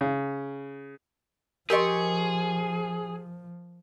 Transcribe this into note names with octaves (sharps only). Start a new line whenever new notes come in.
C#3
F3 G4 G#4 A#4 D#5 C6 C#6